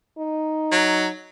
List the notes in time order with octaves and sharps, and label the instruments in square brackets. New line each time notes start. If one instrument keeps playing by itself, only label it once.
[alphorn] D#4
[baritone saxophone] F#3